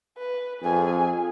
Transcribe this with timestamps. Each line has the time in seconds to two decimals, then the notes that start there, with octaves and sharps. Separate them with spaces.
0.17 B4
0.62 F2 G#4 G#5